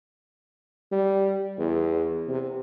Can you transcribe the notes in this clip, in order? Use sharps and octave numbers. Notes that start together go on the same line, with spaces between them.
G3
E2
C3